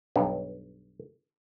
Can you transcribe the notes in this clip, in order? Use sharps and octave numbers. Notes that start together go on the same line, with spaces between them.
B1 G2